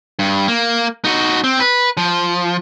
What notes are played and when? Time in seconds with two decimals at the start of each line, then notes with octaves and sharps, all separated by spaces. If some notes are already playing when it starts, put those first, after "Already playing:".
0.19 G2
0.48 A#3
1.04 D#4 F#4
1.44 C4
1.60 B4
1.97 F3